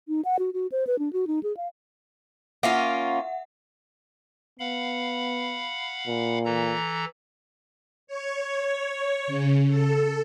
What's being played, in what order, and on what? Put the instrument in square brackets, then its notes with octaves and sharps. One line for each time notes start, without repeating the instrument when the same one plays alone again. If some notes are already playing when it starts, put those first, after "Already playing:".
[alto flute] D#4
F#5
F#4
F#4
C5
B4
D4
F#4
D#4
G#4
F5
[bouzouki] A#3 C#4 F4 [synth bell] E5 F#5
[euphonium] B3 [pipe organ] F5 F#5 B5
[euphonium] A#2
[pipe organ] E3 A4 A#5
[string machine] C#5
C#3
A4